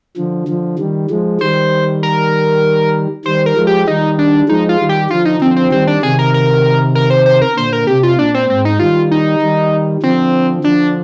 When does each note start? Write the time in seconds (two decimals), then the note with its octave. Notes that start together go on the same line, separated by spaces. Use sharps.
0.17 D3 F3
0.48 D3 F3
0.79 D#3 G3
1.10 F3 G#3
1.40 D#3 G3 C5
2.03 A#4
3.25 D#3 G3 C5
3.46 A#4
3.57 F3 G#3
3.67 G4
3.87 D#3 G3 D#4
4.19 D4
4.49 F3 G#3 D#4
4.69 F4
4.80 D#3 G3
4.89 G4
5.10 D3 F3 F4
5.25 D#4
5.41 D3 F3 C4
5.56 C4
5.72 D#3 G3 C4
5.87 D4
6.02 C3 D#3 G#4
6.19 A#4
6.34 A#4
6.95 A#4
7.10 C5
7.26 C5
7.42 A#4
7.56 A#2 D3 C5
7.73 A#4
7.87 C3 G4
8.03 F4
8.19 A#2 D4
8.34 C4
8.49 G#2 C4
8.65 D#4
8.79 D#3 G3 F4
9.11 D#4
9.42 D#3 G3
10.03 D3 F3 C4
10.64 D3 F3 D4